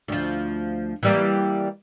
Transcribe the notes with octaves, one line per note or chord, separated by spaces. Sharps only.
D2 F3
E3 G3 A#3